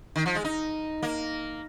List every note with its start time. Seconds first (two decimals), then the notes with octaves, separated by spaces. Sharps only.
0.16 D#3
0.26 F3
0.35 G#3
0.44 D#4
1.03 A#3